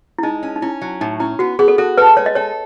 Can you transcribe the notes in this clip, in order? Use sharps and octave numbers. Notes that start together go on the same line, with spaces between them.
E4
G#3 D#4
C#4
D#4
C#4 E4
F#3
A2 D#4
C#4 E4
B3 F#4
B3 G#4
A4
F#4 A4
A4 B4
G#3 C#5
D#5
A4 C#5